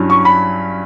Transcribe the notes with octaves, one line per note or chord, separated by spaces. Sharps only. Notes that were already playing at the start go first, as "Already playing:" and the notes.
Already playing: G2 F#3 C#4 E4
C#6
B5